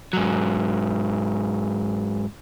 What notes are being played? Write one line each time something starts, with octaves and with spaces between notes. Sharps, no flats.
G#2 F#3